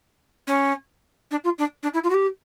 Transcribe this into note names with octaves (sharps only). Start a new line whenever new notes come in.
C#4
D4
F4
D4
D4
E4
F4
F#4
G4